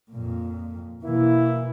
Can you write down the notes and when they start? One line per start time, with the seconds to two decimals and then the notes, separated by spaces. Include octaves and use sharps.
0.11 F2 A#2
1.04 B2 E3 A#3 E4